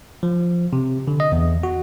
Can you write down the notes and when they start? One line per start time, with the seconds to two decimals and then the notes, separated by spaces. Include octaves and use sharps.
0.23 F3
0.73 C3
1.08 D3
1.20 D#5
1.32 E2
1.63 F#4